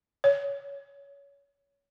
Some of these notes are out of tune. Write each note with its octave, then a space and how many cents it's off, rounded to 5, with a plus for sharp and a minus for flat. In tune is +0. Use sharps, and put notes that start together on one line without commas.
C#5 +25